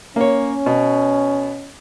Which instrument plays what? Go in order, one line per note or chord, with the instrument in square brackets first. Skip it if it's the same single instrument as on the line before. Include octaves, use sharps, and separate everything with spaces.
[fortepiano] A#3 C#5 [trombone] C#4
[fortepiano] B2